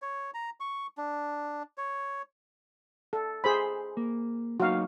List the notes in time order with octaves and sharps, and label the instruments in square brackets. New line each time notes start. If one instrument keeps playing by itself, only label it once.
[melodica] C#5
A#5
C#6
D4
C#5
[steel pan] A4
G#4 C5 B5
[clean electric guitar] A#3
[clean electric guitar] F#3 A#3 D#4 [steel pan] F#4 F5